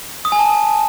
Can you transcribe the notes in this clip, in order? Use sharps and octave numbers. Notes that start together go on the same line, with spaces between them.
D#6
G#5
A5